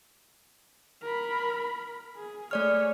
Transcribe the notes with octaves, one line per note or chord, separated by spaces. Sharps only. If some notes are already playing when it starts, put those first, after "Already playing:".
A#4 B5
G#4
A3 G#4 C#5 D5 F6